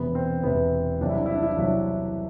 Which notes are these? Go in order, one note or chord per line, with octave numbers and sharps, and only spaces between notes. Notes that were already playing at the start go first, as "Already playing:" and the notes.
Already playing: E1 E2 C3 B3
C4
E1 E2 C3 B3
C2 C3 F#3 D4
E4
D4
E4
D4
E4
D4
C2 C3 F#3 E4
D4